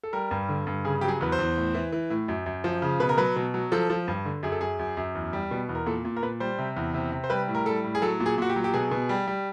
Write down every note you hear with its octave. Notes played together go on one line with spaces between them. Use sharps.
A4
G3 A#4
G2
D3
G2
C#3 G#4
F#3 G4
G#4
E2 B4
C5
E2
A2
E3
E3
A2
F#2
F#2
F3
C#3
B2 B4
A#4
F#3 B4
B2
F#3
F3 A4
F3
G2
D3
F#2 G#4
A4
F#2 G#4
F#2
F#2
E2
G3
B2
E2
A#4
A#2 A4
A#2
A#4
A#2 B4
G3 C5
C3
E2
C3
C3
C5
G3 B4
A2
A#4
G3 A4
A2
G#4
F#3 A4
A#2
G#4
A#2 F#4
G4
F#3
G4
B2 G#4
B2
G3
G3